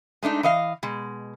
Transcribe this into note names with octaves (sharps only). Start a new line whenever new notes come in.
G#3 A3 D4 D#4
E3 D#5 F5
B2 G#3